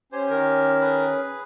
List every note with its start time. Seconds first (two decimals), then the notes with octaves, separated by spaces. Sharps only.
0.12 C#4 G4 C5 G#5
0.30 D#3 A#4
0.81 G#4 B4